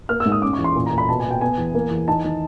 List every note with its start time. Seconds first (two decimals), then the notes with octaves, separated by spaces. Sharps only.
0.09 A#3 F6
0.20 E6
0.26 G#2
0.32 D#6
0.42 C#4 D6
0.53 C#6
0.59 E2
0.64 C6
0.75 A#2
0.86 A#5
0.92 A#2
0.98 B5
1.08 B2 A5
1.20 G#5
1.25 B2
1.31 G5
1.41 B3 G#5
1.58 E2
1.75 A#3
1.91 E2
2.08 D#4 A5
2.24 D#3